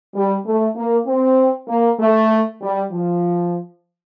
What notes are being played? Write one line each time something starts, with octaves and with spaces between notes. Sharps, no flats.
G3
A3
A#3
C4
A#3
A3
G3
F3